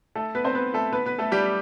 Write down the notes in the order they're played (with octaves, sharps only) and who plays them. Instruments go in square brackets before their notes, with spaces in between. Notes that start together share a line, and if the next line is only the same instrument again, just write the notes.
[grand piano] A3 A4
B3 B4
C4 C5
B3 B4
A3 A4
B3 B4
B3 B4
A3 A4
G3 G4